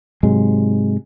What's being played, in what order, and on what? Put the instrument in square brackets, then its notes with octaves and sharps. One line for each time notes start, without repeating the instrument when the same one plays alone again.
[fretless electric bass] G#2 C3 F#3 G#3